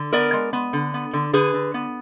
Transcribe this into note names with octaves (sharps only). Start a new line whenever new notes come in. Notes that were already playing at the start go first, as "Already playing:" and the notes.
Already playing: D3
B3 A#4 D5
G#3
B3
D3
B3
D3
D3 G#4 B4
D3
B3